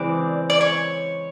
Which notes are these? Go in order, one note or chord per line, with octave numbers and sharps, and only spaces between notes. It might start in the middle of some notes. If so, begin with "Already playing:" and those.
Already playing: C#3 E3 G#3 C4 D5
D5
C#5